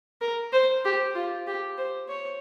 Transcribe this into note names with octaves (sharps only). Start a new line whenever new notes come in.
A#4
C5
G4
F4
G4
C5
C#5